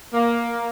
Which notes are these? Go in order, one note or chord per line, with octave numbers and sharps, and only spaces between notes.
A#3